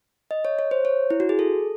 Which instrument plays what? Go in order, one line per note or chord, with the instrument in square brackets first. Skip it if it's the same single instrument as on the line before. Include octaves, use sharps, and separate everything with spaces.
[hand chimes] D#5
C#5
C#5
C5
C#5
E4
F#4
G#4
A4